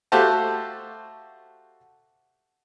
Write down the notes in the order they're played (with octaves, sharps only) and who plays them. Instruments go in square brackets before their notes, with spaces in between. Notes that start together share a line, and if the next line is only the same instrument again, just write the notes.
[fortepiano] A3 F#4 G4 C5 F5 A5